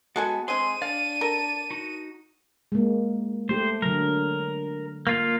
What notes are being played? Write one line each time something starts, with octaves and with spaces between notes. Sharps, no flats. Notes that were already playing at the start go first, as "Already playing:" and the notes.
G#3 B3 F#4 A4 G#5
G#3 C4 G#4 C6 D#7
D4 D5 F5
A4 A#4
D#4 F#4
G#3 A#3
A3 G4 C5
D3 F#3 A#4
A#3 F4 F5